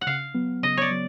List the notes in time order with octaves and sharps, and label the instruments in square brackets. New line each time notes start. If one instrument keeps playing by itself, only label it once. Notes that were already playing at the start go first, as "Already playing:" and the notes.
[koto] F#5
[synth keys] C#3 [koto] F5
[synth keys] F#3 B3
[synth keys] C#3 [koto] D#5
[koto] C#5 D5
[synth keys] F#3